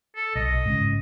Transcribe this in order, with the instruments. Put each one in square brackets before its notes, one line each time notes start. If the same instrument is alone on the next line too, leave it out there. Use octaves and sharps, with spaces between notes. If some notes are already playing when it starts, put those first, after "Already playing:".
[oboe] A4
[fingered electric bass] B1 [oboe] D#5
[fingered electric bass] G#2 C#3